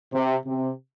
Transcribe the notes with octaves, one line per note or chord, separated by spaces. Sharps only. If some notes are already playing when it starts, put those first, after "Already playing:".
C3
C3